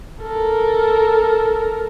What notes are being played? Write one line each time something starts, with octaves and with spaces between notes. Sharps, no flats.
A4 A#4